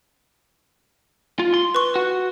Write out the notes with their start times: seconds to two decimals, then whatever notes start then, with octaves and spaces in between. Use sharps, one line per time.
1.39 F4
1.54 C6
1.75 B4 C#6
1.96 F#4